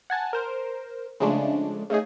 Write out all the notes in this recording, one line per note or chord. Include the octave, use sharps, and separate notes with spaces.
F#5 G#5 A5
A#4 C5
C#3 F3 G#3 A3 D4
C#3 A3 D#4 G#4